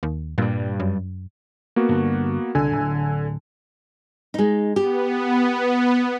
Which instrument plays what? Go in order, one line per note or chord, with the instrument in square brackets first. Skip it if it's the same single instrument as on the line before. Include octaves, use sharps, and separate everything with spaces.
[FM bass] D#2
[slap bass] G2 G3 [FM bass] A#2
[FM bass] F#2
[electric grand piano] A#3 B3 F#4
[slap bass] G2 D3 G3
[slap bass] C2 [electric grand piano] D3 G#5 E6
[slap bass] D1
[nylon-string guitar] G#3 D#4
[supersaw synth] B3 [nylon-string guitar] G4